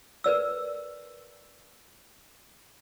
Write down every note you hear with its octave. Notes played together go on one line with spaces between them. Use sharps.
A#4 B4 D5 E6